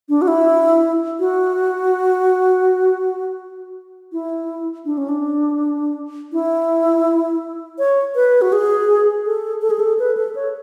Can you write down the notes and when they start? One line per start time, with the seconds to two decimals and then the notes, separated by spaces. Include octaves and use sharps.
0.09 D4
0.22 F#4
0.28 E4
1.20 F#4
4.13 E4
4.85 D4
4.98 C#4
5.08 D4
6.33 E4
7.79 C#5
8.15 B4
8.42 F#4
8.52 G#4
9.26 A4
9.62 A4
9.70 G#4
9.79 A4
9.99 B4
10.17 A4
10.35 C#5